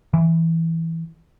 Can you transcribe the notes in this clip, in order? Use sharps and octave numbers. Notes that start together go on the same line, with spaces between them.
E3